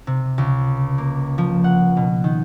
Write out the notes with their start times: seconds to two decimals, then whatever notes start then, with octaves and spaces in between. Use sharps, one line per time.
0.07 C3
0.38 C#2
0.98 A#3
1.38 F3
1.64 F#5
1.97 B2
2.24 D#3